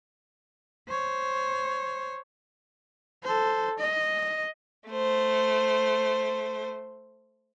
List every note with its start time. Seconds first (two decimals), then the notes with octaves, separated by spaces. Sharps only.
0.88 C5 C#5
3.23 A4 C5
3.78 D#5
4.90 A3 C5